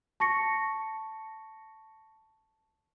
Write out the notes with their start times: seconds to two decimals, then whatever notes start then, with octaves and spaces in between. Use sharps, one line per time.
0.20 A5 C#6 A#6 C#7